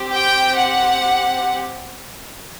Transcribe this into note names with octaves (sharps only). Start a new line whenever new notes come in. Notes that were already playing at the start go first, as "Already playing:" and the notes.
Already playing: C4 G4
G5
F#5